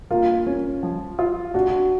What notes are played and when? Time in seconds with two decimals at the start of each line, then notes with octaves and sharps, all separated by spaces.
0.11 A#3 F4
0.47 C#4
0.83 F3
1.19 F4
1.54 D4 F#4